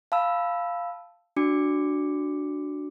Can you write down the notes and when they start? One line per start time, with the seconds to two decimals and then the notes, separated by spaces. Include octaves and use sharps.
0.12 F5 A5 B5 E6
1.37 D4 F#4 D6 C#7